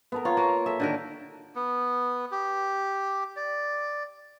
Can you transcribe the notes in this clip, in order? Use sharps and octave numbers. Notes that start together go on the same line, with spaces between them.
B3 A4 A#4
F4 C#5
A#3
A4 E5
D3 D#3 A#4
B3
G4
D5